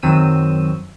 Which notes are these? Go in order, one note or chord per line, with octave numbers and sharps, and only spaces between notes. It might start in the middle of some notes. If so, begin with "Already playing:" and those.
F#2 D#3 F#3 C4 E6 D#7